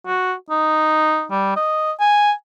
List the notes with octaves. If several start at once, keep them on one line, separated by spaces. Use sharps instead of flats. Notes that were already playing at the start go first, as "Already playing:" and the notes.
F#4
D#4
G3
D#5
G#5